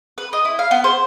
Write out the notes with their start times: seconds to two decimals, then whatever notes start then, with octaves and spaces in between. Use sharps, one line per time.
0.18 B4
0.33 D#5
0.45 E4
0.59 F5
0.71 B3
0.84 C5